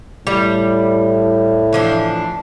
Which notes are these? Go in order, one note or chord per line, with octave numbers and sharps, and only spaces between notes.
A2 G3
E3 F3 D4